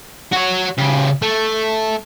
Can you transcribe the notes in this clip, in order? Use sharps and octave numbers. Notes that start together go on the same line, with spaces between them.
F#4 C#5
C#3 G4
A3